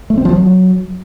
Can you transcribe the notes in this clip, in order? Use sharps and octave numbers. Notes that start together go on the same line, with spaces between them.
A3
C4
F3
F#3